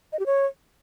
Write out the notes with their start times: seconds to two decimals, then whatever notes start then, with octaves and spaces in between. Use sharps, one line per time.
0.13 D#5
0.19 G4
0.26 C#5